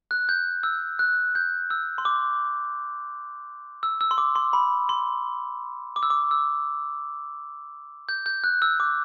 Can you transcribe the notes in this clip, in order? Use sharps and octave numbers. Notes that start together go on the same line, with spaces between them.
F#6
G6
E6
F#6
G6
E6
C6
D6
E6
E6
C6
D6
C6
B5
C6
D6
E6
D6
E6
G6
G6
F#6
E6
D6